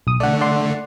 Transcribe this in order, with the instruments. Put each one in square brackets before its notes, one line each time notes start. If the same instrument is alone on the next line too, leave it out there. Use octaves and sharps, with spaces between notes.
[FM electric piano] B1 D#6
[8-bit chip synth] D3 A3 [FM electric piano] D5 F#5
[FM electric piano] D5 F#5 C6